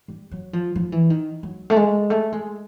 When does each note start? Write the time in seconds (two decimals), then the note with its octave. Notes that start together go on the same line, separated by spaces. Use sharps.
0.08 G3
0.31 F#3
0.53 F3
0.76 F3
0.92 E3
1.10 D#3
1.43 F#3
1.70 A3
1.76 G#3
2.10 A3
2.32 G#3